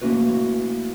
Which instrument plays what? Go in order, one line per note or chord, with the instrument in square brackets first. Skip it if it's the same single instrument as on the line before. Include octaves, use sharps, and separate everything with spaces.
[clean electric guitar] A3 A#3 C#4 E4 F#4 B4